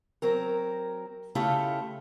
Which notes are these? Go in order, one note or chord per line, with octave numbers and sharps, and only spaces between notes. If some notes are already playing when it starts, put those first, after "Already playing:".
F#3 C4 A#4
C#3 A3 E4 F4 G4 A4